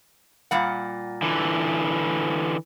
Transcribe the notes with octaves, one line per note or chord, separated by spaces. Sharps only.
A#2 G3 F#5
D3 E3